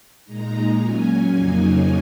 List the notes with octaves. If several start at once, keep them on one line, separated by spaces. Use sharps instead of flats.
A#2 G#3 D#4 A#5
A#2 F#3 C#4 G#5
F2 C#3 F#3 A#3 D#4 G#5